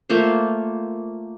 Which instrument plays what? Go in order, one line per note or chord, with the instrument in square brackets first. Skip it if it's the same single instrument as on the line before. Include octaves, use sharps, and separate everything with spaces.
[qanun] A3 A#3 F4 C5